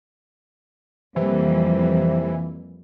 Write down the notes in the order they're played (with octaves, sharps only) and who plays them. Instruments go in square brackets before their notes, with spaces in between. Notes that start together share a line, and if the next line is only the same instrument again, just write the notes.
[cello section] F2 G3 A#3 [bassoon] C3 [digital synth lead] E3